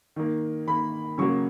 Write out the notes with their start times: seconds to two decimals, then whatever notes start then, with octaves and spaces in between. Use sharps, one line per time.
0.16 D#3 A#3
0.67 D#3 A#3 B5
1.18 C#3 F#3 A#3 C#6